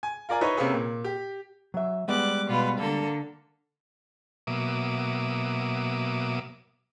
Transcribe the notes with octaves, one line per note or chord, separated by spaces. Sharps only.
G#5
F4 A#4 D5 G#5
D#4 E4 B4 C#5
C3 A#3 C4 C#4 G#4 B4
A#2
G4
F#3 E5
G3 G#3 B3 D6 F#6
B2 F4 B4
D3 A#3 A4
B2 F#3 A#3 E5 D6 D#6